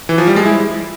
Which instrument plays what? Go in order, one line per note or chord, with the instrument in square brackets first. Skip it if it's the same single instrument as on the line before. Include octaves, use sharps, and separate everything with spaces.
[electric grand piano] E3
F3
G3
G#3
E4